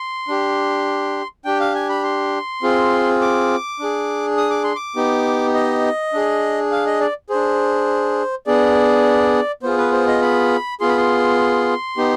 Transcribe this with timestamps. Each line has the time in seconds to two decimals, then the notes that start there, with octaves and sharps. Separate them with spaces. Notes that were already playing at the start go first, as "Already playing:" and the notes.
Already playing: C6
0.28 D4 G4
1.45 D4 G4 G5
1.60 F5
1.75 G#5
1.89 B5
2.04 C6
2.62 C4 F4 G#4
3.21 D6
3.80 D4 G#4
4.37 D#6
4.50 D6
4.64 C6
4.76 D6
4.96 B3 D#4 G4
5.54 D#5
6.13 D4 G#4
6.71 F5
6.86 D#5
7.01 D5
7.30 D4 G#4 C5
8.46 B3 D4 G#4 D5
9.63 B3 F4 G#4 C5
9.77 B4
9.92 C5
10.07 D#5
10.22 B5
10.80 B3 F4 G#4 C6
10.89 B5
10.97 C6
11.97 B3 D#4 G4